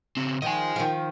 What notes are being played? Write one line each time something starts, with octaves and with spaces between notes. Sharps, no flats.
C#3 C4
D#3 F3 D#5 G#5
D#3 F3